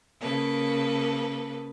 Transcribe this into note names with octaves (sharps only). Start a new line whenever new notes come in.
C#3 A#3 A4 B4